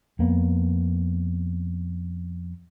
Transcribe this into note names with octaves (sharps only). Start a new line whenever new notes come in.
F2 A#3 B3